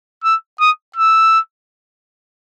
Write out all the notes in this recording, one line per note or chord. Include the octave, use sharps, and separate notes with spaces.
E6
D#6
E6